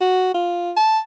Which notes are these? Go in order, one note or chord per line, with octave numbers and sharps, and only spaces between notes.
F#4
F4
A5